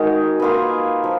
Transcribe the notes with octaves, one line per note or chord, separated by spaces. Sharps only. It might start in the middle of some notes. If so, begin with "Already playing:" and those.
Already playing: D#3 G#3 D#4 F#4 A#4
A#3 F4 G#4 B4
F3